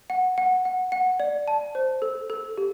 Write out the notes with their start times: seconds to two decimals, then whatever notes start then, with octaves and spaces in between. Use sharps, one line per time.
0.10 F#5
0.38 F#5
0.65 F#5
0.92 F#5
1.20 D5
1.48 A5
1.75 C5
2.02 A4
2.30 A4
2.58 G4